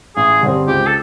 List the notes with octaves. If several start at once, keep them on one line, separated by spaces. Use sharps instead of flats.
A1 G#4
G2 D3 G3 C4
C#2 G4
A4